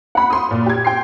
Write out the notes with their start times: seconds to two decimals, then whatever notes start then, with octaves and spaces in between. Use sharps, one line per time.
0.15 F#5 B5
0.30 C6 D#6
0.51 A#2
0.66 G4 G#6
0.84 G5 C6 C7